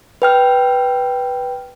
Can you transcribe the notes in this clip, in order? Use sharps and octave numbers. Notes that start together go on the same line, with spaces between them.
B4 G5 F6